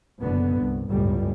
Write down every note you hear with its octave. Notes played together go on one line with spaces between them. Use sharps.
F#1 B2 D3 B3
C2 G2
G1 C#2 F#2 A2 G3